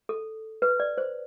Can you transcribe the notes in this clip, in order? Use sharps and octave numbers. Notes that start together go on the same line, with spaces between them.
A4
B4
D5
C5